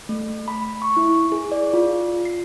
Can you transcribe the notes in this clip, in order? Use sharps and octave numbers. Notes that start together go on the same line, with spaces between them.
A3
B5
C#6
E4
G#4
D5
F4
C7